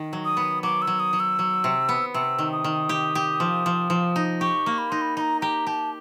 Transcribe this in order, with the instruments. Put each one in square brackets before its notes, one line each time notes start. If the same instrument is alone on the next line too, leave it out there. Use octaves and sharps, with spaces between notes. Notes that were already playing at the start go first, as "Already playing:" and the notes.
Already playing: [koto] D#3
F#3
[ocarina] D#6
[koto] B3
[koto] F#3 [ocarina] D6
[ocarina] E6
[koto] F#3
[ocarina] D#6
[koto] F#3
[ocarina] E6
[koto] F#3
C3
B3
[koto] C3 [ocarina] E6
[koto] D#3
[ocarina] D#6
[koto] D#3
G4
G4
F3
F3
F3
D#4
[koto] G4 [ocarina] C#6
[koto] A#3
[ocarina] B5
[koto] D#4 [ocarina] C6
[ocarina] B5
[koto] D#4 [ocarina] A#5 B5
[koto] G4 [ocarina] A#5
[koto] G4 [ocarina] A5